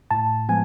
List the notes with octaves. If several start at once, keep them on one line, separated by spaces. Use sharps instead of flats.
A2 A5
F3 G#3 B3 G#5